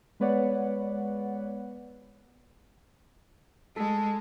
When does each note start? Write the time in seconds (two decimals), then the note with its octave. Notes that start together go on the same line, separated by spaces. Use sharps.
0.20 G#3 B3 B4 C#5 D5 F#5
3.76 G#3 A4 A5